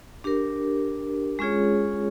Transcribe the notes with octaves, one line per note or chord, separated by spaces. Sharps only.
D4 G4 A#4
G#3 C#4 F4 G#4 C#5